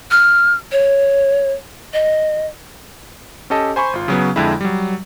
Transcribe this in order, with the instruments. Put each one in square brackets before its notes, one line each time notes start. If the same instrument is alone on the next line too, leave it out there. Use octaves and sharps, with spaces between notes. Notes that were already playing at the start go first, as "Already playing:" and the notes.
[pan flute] F6
C#5
D#5
[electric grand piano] C#4 G4 A4 D#5 A5
C5 G#5 B5 C#6
G#1 F4
C#3 F#3 B3
F2 D3 G#3 E4
F#3 G3